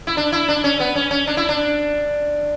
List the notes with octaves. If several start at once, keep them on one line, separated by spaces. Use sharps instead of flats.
E4
D4
E4
D4
C#4
B3
C#4
C#4
D4
E4
D4